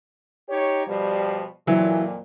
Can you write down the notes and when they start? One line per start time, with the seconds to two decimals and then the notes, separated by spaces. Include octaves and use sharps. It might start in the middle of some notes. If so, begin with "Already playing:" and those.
0.49 D#4 G4 C#5
0.87 B2 F3 G3
1.67 F2 A#2 E3 F#3